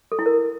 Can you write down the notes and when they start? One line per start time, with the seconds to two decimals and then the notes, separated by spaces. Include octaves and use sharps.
0.12 A4
0.19 E4
0.26 A#4